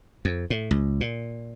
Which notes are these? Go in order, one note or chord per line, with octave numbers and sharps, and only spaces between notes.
F2
A2
C#2
A#2